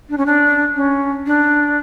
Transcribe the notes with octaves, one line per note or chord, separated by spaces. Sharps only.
D4
C#4
D4
C#4
D4